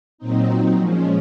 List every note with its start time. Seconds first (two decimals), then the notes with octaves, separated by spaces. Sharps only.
0.18 A#2 F#3 C4 D#4
0.76 A#2 F3 G#3 C#4